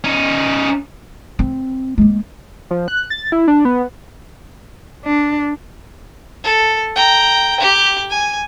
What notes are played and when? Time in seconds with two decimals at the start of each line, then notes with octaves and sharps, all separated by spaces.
0.04 C#4 D#4
1.39 C4
1.98 G#3 A#3
2.71 F3
2.88 F#6
3.10 A6
3.32 E4
3.48 D4
3.65 B3
5.05 D4
6.44 A4
6.96 G5 A#5
7.60 G4
8.10 G#5